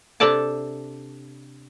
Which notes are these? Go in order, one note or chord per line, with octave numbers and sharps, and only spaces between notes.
C3 D4 A4 D5 A5